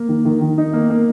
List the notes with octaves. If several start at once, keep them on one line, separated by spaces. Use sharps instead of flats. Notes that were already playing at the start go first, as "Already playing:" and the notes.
Already playing: A#3
D#3
D#3
D#3
D#4
A#3
A#3